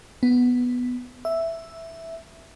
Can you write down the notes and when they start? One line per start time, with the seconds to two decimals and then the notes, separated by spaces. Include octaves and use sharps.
0.23 B3
1.25 E5